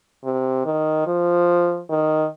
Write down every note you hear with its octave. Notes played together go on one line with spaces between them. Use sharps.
C3
D#3
F3
D#3